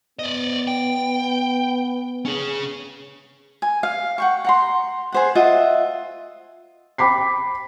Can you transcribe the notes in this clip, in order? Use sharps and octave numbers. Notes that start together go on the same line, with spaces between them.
B3 D5 D#5
G5
C#4 G#4
G#5
F5
F#5 G5 C#6
F#5 A#5 C6
G#4 C5 F#5
F4 D#5 E5 F#5
G5 B5 D6 B6 C7